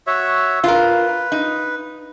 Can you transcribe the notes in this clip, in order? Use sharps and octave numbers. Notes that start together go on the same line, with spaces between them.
F#4 C#5 E5
F4 A#4 B4
D#4